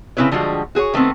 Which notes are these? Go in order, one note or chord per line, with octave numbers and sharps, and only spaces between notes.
C#3 C4 E4 B4 C#5
D3 F3 G3 G#3 F#4
F#4 G#4 C5 C#5
D#3 A3 B3 C4